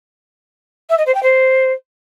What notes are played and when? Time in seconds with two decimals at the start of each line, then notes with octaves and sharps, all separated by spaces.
0.89 E5
0.97 D#5
1.06 C5
1.14 G5
1.22 C5